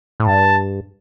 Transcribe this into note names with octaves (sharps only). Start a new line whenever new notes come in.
A2
G2 A5